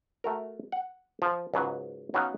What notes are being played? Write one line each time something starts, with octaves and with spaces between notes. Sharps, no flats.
A3 F#4 A#4
F#5
F3
C#2 G#2 F#3 B4
F#3 B3 C#4 D#4 F5 F#5